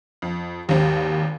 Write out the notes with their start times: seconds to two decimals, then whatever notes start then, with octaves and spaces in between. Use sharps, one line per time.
0.22 F2
0.69 G#1 D#2 G4